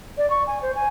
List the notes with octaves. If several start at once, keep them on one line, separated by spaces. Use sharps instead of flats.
D5
C#6
G#5
C5
G#5